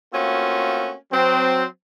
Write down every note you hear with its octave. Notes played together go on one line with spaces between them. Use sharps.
A3 A#3 C4 C#4 F4 F#4
F#3 C4